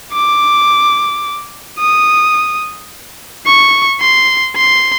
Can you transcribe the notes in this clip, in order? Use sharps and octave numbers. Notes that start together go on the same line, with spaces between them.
D6
D#6
C#6
C6
C6